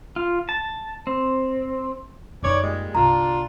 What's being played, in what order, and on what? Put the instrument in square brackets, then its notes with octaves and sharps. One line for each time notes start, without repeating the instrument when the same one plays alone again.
[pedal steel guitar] F4
A5
C4
[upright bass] F#2 D#4 [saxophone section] E3 C#5 D5
[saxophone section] A#2 G3 G#3
[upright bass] G1 C2 [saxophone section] D4 F4 [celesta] A#5